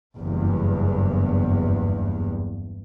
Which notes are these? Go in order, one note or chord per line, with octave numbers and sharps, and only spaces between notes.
F#1 E2 G2